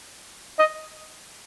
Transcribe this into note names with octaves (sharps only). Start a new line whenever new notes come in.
D#5